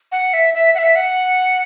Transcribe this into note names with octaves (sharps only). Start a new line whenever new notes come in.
F#5
E5
E5
F#5
E5
F#5